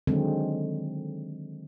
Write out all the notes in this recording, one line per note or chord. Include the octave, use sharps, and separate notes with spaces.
D3 D#3 F#3 G#3 C4